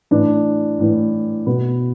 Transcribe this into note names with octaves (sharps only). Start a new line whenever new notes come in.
A2 E3 D4
A2 E3
B2 B3